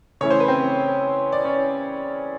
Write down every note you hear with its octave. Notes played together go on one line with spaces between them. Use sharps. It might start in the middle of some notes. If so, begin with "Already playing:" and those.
C#3 E3 A3 C#4 E4 C#5
C5
B4
C4 C5
D5
C#4 C#5